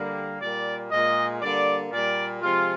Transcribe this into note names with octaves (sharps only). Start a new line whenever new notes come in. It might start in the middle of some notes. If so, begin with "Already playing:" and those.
Already playing: D3 G3 A#3
A#2 G3 A#3 D5
A#2 G#3 D#5
D3 G3 A#3 D5
A#2 G3 A#3 D5
C3 F3 G#3 F4